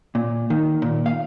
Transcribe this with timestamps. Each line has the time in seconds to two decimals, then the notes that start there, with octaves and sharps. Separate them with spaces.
0.15 A#2
0.50 D#3
0.82 A#2
1.06 F5